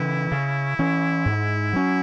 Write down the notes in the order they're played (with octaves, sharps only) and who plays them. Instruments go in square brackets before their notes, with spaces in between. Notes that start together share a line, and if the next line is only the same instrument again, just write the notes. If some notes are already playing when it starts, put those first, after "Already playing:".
Already playing: [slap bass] C#3 E3 [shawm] E4
[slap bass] C#3
E3 C#4
G#2
F#3 C#4